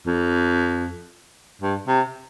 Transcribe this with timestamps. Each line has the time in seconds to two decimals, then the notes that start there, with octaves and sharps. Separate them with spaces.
0.06 F2
1.61 G2
1.87 C3